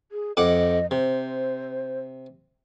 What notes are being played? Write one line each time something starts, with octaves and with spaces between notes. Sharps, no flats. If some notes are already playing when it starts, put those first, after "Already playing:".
G#4
F2 D#5 F#5 D6
C3 C5